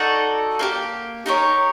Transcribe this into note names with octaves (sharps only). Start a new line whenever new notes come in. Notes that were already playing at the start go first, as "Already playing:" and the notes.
Already playing: D#4 F#4 A4 D5
A#3 D4 G4
D#4 G4 A#4 C#5